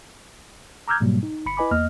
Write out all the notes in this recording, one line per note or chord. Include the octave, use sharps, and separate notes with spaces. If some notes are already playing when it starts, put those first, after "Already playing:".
A#5 D6 E6 F6 G6 G#6
G#2 B2 F#3 G3 A#3
D#4
G1 B5 C#7
E4 B4 D#5 G#5 B5 D6
E2 A#3 D#5 F6